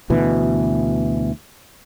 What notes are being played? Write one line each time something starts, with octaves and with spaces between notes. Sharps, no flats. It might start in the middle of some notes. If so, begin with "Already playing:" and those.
D2 B2 E3